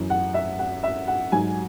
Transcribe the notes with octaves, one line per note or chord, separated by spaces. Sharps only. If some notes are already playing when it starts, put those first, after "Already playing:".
Already playing: F#2 E3
F#5
E5
F#5
E5
F#5
G#2 F#3 G#5